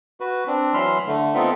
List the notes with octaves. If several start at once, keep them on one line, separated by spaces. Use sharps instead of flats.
F#4 B4
C4 D4
E3 F#3 B5 C6 E6 F6
D3 A3
B3 C4 D#4 F4 A4 E5